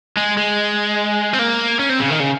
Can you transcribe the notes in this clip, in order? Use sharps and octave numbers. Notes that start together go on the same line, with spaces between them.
G#3
G#3
C4
A#3
C#4
C4
C#3
D#3
C#3